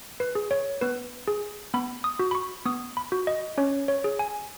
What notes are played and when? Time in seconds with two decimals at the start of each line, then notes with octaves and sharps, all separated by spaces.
0.20 B4
0.35 G#4
0.51 C#5
0.81 B3 B4
1.28 G#4
1.74 B3 B5
2.04 D#6
2.19 F#4
2.31 B5
2.35 C#6
2.65 B3 D#6
2.97 B5
3.12 F#4
3.27 D#5
3.58 C#4 C#5
3.88 C#5
4.04 G#4
4.19 G#5